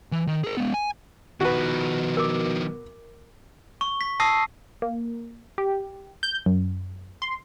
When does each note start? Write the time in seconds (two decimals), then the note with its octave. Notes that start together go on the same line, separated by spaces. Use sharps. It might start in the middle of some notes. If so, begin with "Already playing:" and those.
0.12 E3
0.27 D#3
0.44 G#4 A#4
0.57 G#3 B3
0.74 G#5
1.41 B2 D#3 F3 F#4 B4
2.17 A#4 D6
3.81 C#6
4.01 B6
4.20 A5 D#6 E6 A#6 C7
4.82 A#3
5.58 G4
6.23 G6
6.46 F#2
7.22 C6